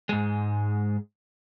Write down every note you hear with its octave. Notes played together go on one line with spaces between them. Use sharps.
G#2 G#3